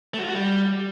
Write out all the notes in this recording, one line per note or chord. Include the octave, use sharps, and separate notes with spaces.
A3
F#4
F4
F#4
G3